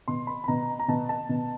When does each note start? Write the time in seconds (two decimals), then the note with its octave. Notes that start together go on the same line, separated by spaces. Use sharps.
0.08 B2 C6
0.27 B5
0.44 B5
0.48 B2 A#5
0.79 A#5
0.88 B2 A5
1.09 A5
1.29 B2